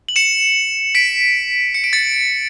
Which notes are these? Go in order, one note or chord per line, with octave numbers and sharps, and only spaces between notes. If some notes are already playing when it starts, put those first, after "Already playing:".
F#7
C#7 E7
B6 D7
C#7
D7
A6 C#7